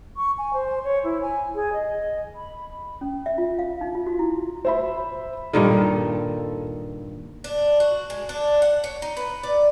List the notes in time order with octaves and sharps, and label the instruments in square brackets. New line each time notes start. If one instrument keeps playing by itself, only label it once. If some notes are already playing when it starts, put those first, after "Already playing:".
[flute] C#6
G#5
C5
C#5
E4
G#5
G#4
D#5
B5
[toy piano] C#4
E5
F4
F5
D#4
F4
F#4
E4
[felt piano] C5 E5 B5
[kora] G2 A#2 D#3 [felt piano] A4
[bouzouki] D4
F#4
G#3
D4
F#5
C#5
D#4
B4
D5